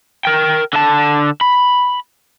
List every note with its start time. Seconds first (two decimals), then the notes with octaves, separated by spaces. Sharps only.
0.25 A#4 G5
0.73 D3 A5
1.41 B5